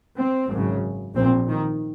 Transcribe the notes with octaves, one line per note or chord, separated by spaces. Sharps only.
C4
G#1 F#2 C#3
A#1 A#2 C4
D#3